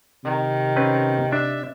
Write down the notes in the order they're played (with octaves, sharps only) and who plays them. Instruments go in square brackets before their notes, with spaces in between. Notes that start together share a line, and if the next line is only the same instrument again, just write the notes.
[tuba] C3 [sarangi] D#3
[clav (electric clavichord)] C4 C#4 B4
[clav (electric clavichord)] D4 [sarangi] E5